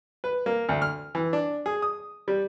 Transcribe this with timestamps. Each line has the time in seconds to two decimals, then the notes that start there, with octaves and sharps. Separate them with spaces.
0.24 B4
0.46 A#3
0.69 D2
0.82 F6
1.15 E3
1.33 D4
1.66 G#4
1.82 D#6
2.28 G3